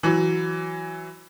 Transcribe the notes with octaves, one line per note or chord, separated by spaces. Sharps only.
E3 F#3